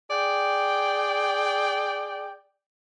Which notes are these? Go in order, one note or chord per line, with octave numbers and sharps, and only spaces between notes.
G#4 D5 G5